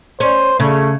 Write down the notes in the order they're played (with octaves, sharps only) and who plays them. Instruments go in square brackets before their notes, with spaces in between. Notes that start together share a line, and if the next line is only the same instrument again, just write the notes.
[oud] C#4 [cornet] C5
[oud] C#3 [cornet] A3